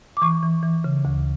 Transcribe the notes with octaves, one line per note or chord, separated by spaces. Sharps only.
D6
E3 C#6
E3
E3
C#3
D2